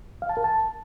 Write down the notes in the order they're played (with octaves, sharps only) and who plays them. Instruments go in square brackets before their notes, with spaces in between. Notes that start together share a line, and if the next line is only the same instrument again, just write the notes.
[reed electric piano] F5
A5
A#4
A5